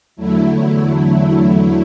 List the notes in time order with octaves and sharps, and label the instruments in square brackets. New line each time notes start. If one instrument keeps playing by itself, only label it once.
[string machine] E2 D3 F#3 A3 E4